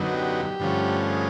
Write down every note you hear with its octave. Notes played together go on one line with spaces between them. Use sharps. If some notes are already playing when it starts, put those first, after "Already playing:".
Already playing: F#2 D3 F#3 B3 D#4
G4
G2 D3 F3 A3 C#4
G#4